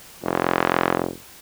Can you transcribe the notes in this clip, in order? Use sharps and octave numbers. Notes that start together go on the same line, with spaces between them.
F1